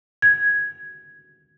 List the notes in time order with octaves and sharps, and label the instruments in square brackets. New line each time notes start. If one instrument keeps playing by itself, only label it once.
[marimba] G#6